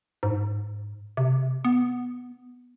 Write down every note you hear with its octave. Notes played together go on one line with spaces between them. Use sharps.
G#2
C3
B3